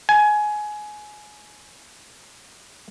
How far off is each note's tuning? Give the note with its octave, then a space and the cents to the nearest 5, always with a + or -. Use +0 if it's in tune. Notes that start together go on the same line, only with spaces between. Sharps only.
G#5 +20